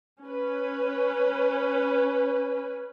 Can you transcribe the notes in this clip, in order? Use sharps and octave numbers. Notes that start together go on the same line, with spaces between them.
C#4 B4